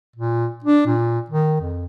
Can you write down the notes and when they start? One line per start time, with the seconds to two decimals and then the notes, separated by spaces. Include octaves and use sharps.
0.16 A#2
0.64 D4
0.86 A#2
1.30 D#3
1.61 F2